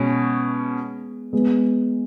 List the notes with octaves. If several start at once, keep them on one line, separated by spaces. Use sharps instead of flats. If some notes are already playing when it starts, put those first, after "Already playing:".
Already playing: B2 G#3 B3 C#4
G#3 B3